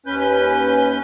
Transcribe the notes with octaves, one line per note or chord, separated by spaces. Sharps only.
D#2 C#4 B4 G6